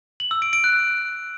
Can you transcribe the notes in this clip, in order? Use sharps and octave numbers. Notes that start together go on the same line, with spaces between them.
F#7
E6
D7
D7
F#6